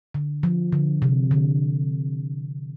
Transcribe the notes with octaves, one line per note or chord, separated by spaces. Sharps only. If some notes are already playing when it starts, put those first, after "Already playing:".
D3
F3
D3
C3
D3